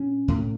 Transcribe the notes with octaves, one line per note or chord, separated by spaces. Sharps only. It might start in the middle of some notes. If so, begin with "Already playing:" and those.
Already playing: A#2 C#4
A2